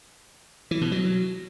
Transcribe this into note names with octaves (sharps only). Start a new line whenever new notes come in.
E3
B2
F#3